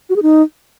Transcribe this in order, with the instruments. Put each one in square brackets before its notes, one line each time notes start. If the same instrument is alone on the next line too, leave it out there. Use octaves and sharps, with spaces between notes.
[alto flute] F#4
G#4
D#4